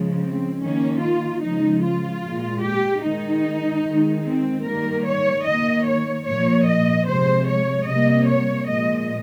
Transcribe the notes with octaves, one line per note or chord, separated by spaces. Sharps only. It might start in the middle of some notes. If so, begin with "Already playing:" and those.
Already playing: C#3 F3 G#3
C4
D#3 A#3 C#4
F4
C#3 F3 G#3 D#4
F4
A#2 G#3
G4
D#3 G#3 D#4
D#3 G#3
C4
D#3 G3 A#3 A#4
C#5
D#3 A#3 D#5
C#5
A#2 F3 A#3 C#5
D#5
C3 F3 G#3 C5
C#5
C3 G3 A#3 D#5
C#5
A#2 F3 G#3 D#5